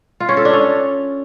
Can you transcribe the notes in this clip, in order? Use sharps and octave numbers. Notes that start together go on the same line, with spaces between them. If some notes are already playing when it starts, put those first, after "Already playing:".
F4
C#4
A4
D4
C#4